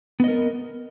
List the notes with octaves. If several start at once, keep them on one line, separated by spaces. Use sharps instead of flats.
B3 A#4 D#5